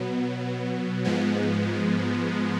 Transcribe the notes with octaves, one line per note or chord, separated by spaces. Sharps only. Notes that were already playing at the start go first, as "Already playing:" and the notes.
Already playing: B2 F#3 B3
G#2 F3 G#3 B3